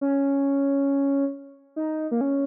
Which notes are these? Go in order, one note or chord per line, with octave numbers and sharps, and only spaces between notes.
C#4
D#4
A#3
C#4